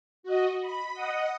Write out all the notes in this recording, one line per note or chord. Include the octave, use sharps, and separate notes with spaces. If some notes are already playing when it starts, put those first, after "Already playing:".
F#4 D#5
B5
D#5 F#5 D#6